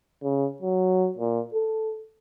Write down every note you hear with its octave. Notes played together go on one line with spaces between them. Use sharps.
C#3
F#3
A#2
A4